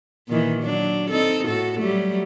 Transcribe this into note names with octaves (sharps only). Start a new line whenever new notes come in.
A#2 D#3 E3
F#3 D4
C4 D#4 A4
A2 F#4 A4
F#3 G3 A3